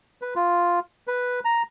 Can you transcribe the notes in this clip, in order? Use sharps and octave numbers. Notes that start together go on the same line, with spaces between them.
B4
F4
B4
A#5